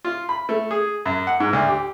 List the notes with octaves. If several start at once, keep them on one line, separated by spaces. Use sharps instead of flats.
F4
B5
A3
G#4
F#2
F#5
G#2
D2
G4